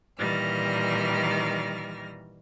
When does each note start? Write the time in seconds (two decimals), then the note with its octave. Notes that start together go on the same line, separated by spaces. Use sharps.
0.18 A#2 D#3 E3 G3 F6 A#6